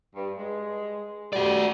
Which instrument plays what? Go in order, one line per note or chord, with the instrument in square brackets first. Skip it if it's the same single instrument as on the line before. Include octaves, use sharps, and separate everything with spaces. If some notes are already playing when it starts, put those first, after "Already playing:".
[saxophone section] G2
G#3
[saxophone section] G3 [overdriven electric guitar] F#4 D5